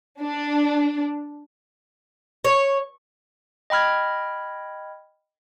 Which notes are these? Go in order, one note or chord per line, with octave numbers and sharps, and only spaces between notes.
D4
C#5
D#5 G5 B5 F6 G#6